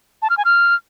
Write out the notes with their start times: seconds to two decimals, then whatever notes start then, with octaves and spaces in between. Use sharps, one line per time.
0.22 A5
0.30 F6
0.37 G#5
0.45 F6